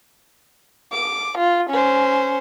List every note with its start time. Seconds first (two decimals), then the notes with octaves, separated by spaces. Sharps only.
0.92 D6
1.38 F4
1.70 C#4 C5